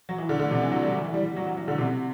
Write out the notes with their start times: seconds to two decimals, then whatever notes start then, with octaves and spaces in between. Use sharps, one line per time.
0.09 F#3
0.18 E3
0.29 D3
0.40 D3
0.51 C3
0.62 E3
0.71 F#3
0.83 G3
0.93 E3
1.04 E3
1.14 G3
1.25 G3
1.36 F#3
1.47 F#3
1.57 F#3
1.68 D3
1.78 C3